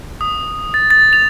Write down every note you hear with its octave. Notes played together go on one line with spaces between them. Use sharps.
D#6
A6
A6
F7